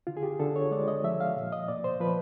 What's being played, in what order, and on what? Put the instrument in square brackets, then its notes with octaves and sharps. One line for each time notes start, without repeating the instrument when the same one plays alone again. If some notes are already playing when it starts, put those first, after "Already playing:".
[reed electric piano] D3 F4
G#4
G4
D3 A4
C#5
G#3 D5
D#5
F3 E5
F5
A#2
D#5
A#2 D5
C5
F3 B4